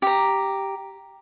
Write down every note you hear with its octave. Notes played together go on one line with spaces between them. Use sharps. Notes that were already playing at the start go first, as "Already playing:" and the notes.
G4 A#5